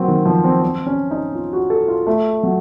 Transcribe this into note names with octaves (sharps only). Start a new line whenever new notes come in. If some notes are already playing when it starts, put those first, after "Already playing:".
Already playing: F#3 A#3 C4
D#3
F3
C4
C4
C#4
D#4
F4
F#4
A4
F4
A3
F#3